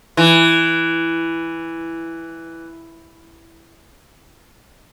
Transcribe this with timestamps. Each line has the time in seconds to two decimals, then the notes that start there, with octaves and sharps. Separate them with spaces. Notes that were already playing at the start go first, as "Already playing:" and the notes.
0.17 E3